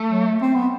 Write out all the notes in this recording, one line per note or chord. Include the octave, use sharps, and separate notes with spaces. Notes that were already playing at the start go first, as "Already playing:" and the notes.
Already playing: A3
F#3
C4
B3